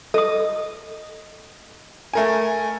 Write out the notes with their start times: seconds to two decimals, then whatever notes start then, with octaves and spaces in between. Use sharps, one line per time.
0.14 A4 D#5 D#6
2.14 A3 A#4 G#5